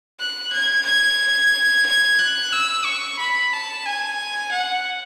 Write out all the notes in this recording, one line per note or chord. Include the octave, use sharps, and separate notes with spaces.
F#6
G#6
G#6
G#6
F#6
E6
C#6
B5
A5
G#5
F#5